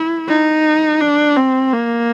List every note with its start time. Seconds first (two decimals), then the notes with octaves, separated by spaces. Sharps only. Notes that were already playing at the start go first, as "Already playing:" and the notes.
Already playing: E4
0.29 D#4
1.01 D4
1.37 C4
1.73 A#3